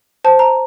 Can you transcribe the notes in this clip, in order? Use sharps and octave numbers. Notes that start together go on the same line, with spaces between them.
C5 A5
A#5